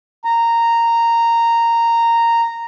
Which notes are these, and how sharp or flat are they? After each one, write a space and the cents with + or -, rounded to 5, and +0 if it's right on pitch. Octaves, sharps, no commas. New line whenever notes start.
A#5 -10